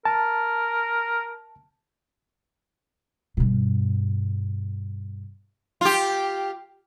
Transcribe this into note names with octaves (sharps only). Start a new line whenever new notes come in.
A#4 A5
G2 B2
F4 G4